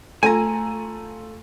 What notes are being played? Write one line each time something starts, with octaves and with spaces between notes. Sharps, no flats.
A3 F4 A4 G#5 A#5